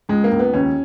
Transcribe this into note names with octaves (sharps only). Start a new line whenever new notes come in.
C#2 G#3
A#3
C#2
B3
D#2 C#4